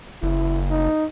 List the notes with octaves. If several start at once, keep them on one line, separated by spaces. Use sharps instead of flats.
F#1 E4
D#4